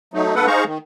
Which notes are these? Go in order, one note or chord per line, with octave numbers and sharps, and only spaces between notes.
F#3 A3 D#4
G2 A#3 A4 B4 F#5
D#4 G#4 C5 F5 A#5 C#6
D#3